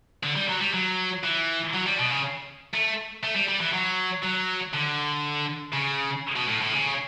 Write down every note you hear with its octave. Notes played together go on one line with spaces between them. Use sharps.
D3
G3
F#3
G3
F#3
E3
F#3
G3
B2
C#3
A3
A3
G3
G3
E3
F#3
F#3
D3
C#3
B2
A2
A2
C#3